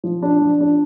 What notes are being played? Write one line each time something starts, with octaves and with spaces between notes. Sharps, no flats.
F3
D4
F3
D4